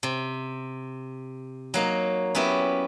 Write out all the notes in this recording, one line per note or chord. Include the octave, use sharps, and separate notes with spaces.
C3
F#3 A#3 D#4
F#3 B3 C#4 E4 G4